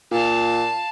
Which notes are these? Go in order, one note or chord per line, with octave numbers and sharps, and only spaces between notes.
A#2 F5 A5